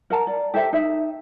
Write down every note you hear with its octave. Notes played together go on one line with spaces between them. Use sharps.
A#4 F#5 A5 A#5
D5
G4 A4 C5 E5
D#4 E5